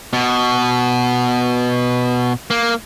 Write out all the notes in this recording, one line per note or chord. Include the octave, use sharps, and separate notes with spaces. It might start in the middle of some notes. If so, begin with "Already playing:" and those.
B2
A#3